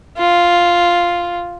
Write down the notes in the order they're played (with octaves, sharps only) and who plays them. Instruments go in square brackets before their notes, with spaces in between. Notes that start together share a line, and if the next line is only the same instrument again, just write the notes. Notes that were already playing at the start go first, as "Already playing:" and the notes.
[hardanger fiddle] F4